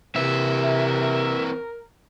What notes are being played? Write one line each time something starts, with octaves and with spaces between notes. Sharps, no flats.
C3 E3 C4 A#4 E5